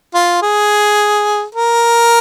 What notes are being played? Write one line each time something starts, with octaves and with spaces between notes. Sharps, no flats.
F4
G#4
A#4